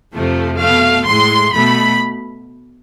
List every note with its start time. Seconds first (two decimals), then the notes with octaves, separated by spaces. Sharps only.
0.14 F2 C3 F3 A3
0.60 B2 A3 F5
1.06 A2 G#3 C6
1.54 B2 A3 B5